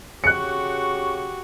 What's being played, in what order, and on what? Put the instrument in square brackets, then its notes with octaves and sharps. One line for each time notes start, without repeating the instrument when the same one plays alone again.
[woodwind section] C#3 C#6 [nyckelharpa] F#4 G4 [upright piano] F#6 C#7